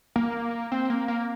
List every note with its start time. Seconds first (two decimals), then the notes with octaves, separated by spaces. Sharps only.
0.16 A#3
0.72 C4
0.90 A#3
1.08 A#3